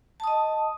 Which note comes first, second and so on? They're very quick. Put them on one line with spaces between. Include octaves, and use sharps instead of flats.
A5 D#6 D#5